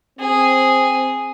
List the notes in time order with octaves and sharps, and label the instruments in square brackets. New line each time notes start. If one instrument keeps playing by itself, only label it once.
[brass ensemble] C4 [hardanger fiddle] G#4